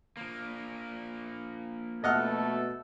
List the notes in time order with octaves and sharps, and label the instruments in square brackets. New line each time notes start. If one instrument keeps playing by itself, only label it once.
[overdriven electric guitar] F3 A#3
[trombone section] B2 A3 [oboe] A4 [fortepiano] D#5 F#5 F6